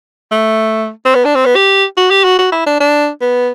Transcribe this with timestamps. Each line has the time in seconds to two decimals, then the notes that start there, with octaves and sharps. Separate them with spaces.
0.31 A3
1.05 C4
1.15 B3
1.25 D4
1.35 C4
1.46 B3
1.56 G4
1.97 F#4
2.10 G4
2.24 F#4
2.38 F#4
2.52 E4
2.66 D4
2.80 D4
3.21 B3